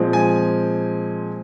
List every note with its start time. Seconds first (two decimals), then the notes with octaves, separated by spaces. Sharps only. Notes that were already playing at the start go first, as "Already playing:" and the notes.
Already playing: A#2 F3 G#3 C4
0.13 G#5